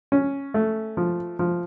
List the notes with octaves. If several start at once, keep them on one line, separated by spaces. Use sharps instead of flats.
C#4
A3
F3
F3